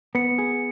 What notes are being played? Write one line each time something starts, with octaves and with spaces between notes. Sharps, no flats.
B3 C#7
G#4